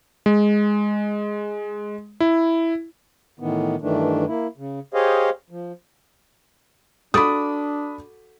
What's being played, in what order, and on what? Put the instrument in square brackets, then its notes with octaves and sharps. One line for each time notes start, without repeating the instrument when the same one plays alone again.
[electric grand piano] G#3
E4
[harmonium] A2 D#3 E3 B3
G2 D#3 E3 A3 D4
A#3 E4
C#3
G4 G#4 C5 C#5 D#5 F5
F3
[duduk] D4 [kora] F#4 A4 D5 [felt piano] B5 D#6